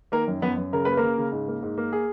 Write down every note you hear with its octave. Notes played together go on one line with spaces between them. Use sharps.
D#3 A#3 A#4
F#2
F#2 B3 B4
F#2
C#3 A#4
A#3 B4
A#3 A#4
C#3
C#3
G#2
A#3
G#2
A#3
G#4